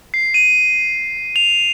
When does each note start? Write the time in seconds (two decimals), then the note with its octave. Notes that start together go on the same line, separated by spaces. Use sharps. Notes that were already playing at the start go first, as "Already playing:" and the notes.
0.14 C7
0.34 D#7
1.36 F7